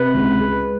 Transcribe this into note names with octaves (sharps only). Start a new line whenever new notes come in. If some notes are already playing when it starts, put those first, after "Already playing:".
Already playing: C3 B4
C#2
G#3